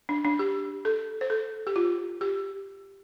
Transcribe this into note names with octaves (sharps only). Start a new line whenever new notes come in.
D4
D4
G4
A4
C5
A4
G4
F4
G4